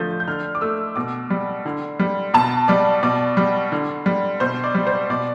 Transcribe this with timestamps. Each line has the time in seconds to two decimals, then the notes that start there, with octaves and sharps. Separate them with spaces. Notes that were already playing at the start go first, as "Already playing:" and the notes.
Already playing: D3 F3 A3 G6 A6
0.20 G6
0.27 D3 F6
0.55 D6
0.61 A3 E6
0.96 B2 D6
1.30 G3
1.65 D3
2.00 G3
2.34 B2 A5
2.68 G3 D5
3.03 B2 D5
3.37 G3
3.72 D3
4.06 G3
4.40 B2 C5
4.64 D5
4.75 G3
4.87 C5
5.10 B2 D5